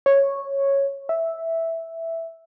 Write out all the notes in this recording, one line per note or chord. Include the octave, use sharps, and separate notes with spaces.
C#5
E5